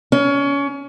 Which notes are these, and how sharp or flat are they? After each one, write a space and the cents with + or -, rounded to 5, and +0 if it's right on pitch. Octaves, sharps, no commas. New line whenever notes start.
C#4 +25